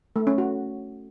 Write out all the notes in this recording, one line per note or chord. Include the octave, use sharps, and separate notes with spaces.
A3
C#4
F#4